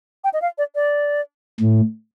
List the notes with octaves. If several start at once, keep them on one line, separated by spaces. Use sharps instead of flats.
G5
D#5
F5
D5
D5
A2